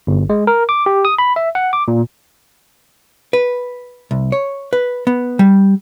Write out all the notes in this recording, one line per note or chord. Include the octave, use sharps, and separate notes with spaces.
G1
G#3
A#4
D6
G4
D#6
B5
E5
F#5
D6
A#2
B4
C2
C#5
B4
B3
G3